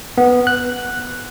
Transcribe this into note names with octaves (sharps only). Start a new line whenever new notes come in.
B3
F#6